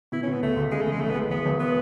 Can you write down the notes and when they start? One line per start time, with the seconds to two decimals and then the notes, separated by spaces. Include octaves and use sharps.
0.12 B2 E4
0.23 C#4
0.28 B2 B3
0.42 C#2 A3
0.56 C#2
0.71 C#3 G#3
0.81 A3
0.86 E2
0.92 G#3
1.01 A1 A3
1.11 B3
1.15 G#3
1.30 E1 B3
1.45 E1
1.60 B3